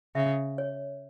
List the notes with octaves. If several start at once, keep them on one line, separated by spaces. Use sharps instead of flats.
C#3 E5
C#5